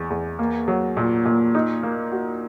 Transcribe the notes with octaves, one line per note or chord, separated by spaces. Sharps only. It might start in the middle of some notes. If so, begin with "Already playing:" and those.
Already playing: E2
E2
A#3
F#3
A#2
A#2
D#4
A#3
F#4